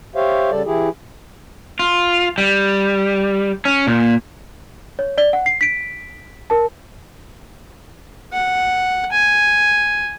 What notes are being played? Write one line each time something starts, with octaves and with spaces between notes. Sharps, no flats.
G4 C5 C#5 E5 F5
C#3 G3 A4 D5
E3 E4 G4 G#4
F4
G3
C#4
A#2
C#5
D5 G7
F#5
C7
B6 D7
A#4 A5
F#5
G#5